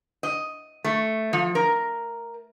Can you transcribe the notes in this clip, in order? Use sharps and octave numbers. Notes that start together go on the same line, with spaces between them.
D#5
A3
F3
A#4